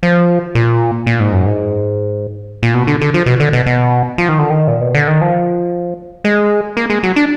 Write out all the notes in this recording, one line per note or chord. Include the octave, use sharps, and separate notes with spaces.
F3
A#2
A#2
G#2
F#2
G#2
A#2
B2
D3
D3
F3
B2
D3
B2
B2
F3
D#3
D3
D#3
A#2
B2
D3
D#3
F3
G#3
A#3
G#3
F#3
D4